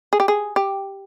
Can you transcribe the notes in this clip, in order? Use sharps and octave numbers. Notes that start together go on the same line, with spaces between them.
G#4
G4
G#4
G4